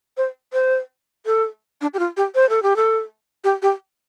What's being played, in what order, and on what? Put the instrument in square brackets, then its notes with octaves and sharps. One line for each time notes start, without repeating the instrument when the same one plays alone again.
[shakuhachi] C5
C5
A4
D4
G4
F4
G4
C5
A4
G4
A4
G4
G4